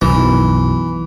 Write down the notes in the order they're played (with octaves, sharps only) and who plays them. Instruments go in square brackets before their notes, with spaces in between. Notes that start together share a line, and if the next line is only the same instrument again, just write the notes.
[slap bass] B1 F#2 [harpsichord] E3